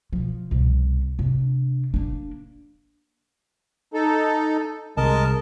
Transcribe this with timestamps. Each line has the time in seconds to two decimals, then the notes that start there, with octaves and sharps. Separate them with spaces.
0.13 B2 F3
0.51 C2 B2
1.19 C3 D4
1.94 A#3 D4
3.94 D#4 A4
4.97 C2 C3 G#3 A#4 D#5 A5